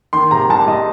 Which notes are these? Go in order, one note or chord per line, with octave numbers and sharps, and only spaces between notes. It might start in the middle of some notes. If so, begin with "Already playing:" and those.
D#3 C6
C3 A#5
C2 A5
C2 D#5